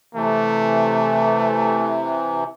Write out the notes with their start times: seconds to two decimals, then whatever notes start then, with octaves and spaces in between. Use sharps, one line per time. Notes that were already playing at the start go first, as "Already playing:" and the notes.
0.15 C3 E3 A3